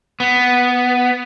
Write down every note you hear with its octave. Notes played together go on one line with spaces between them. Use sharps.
B3